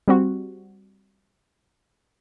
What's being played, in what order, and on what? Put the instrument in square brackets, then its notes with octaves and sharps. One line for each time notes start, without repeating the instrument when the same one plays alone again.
[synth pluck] G3 C4 F#4